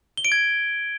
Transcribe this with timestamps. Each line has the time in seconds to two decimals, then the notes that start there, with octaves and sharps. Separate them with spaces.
0.17 G7
0.25 D7
0.32 G#6